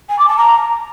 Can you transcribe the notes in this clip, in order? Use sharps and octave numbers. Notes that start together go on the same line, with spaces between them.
G#5
D6
A5
A#5